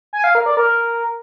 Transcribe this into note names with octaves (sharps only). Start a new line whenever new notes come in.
G#5
F5
A#4
D5
A#4